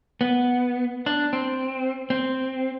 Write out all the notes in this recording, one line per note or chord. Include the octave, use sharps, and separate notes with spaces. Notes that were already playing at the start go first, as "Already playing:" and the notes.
B3
D4
C4
C4